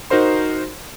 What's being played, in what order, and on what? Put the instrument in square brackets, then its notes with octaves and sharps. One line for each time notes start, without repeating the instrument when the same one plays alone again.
[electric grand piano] D#4 F#4 A#4 C5 C6